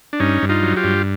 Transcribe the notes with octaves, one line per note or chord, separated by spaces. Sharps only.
D4
G2 C#4 D#4
G2
D#4 F4
F#3
F4 G4
G2